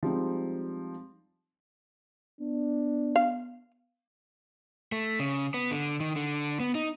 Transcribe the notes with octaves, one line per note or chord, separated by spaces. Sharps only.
F3 G3 G#3 C4 D#4
B3 D4
F5
A3
C#3
B3
D3
D#3
D3
B3
D#4